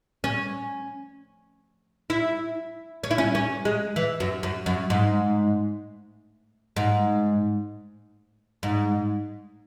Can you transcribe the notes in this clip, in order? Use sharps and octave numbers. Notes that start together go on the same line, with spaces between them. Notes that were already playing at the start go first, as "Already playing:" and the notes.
C#4
E4
C#4
E4
C#4
C#4
G#3
E3
F#2
F#2
F#2
G#2
G#2
G#2